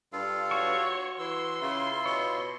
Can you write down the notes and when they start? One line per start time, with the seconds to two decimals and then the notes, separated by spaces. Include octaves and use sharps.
0.13 G2 F4 A4 F5
0.51 F#4 C#5 C#6
1.19 E3 C6 E6
1.61 C#3 E4 F4 E5
2.06 B2 C#5